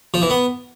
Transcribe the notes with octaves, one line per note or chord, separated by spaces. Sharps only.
F3
E3
B3